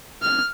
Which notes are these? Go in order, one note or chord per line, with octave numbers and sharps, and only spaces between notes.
F6